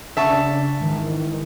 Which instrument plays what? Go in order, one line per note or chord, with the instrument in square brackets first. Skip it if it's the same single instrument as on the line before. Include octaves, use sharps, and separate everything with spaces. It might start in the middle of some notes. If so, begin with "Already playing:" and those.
[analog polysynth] C#3 D4 [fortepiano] E5 A5 C#6
[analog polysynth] G#2 D#3 E3